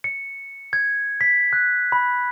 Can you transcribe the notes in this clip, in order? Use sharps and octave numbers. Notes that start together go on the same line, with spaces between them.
C#7
G#6
B6
F#6
B5